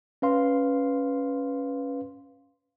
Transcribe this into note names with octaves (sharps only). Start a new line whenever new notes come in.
C#4 B4 F5 C6